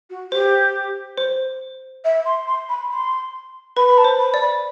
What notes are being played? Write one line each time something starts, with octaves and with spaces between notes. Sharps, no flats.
F#4
G4 C5
C5
E5
C6
C6
B5
C6
B4 B5
B5
A5
C5
B5
D5
B5